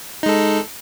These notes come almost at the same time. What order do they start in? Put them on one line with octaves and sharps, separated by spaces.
D#4 G#3 A4